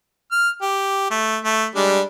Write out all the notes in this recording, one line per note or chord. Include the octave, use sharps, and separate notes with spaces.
F6
G4
A3
A3
G3 G#3 D4